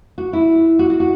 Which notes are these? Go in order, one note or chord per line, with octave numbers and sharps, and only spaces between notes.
F#4
E4
F#4
F#4
F#4